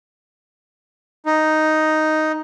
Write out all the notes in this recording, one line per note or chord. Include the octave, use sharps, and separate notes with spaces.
D#4